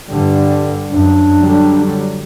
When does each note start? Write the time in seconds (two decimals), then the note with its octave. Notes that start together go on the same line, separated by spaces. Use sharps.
0.10 G2 D3 G3
0.90 F#2 D4
1.39 D3 F#3 G3